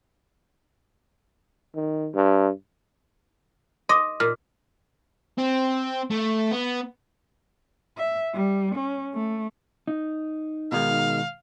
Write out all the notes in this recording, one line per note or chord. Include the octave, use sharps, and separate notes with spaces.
D#3
G2
D#5 C6 D6 D#6
A#2 F6
C4
A3
B3
E5
G3
C#4
A3
D#4
B2 D#3 G#3 F5